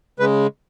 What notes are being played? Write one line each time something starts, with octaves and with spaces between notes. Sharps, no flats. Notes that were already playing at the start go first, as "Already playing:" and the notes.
C#3 G#3 B4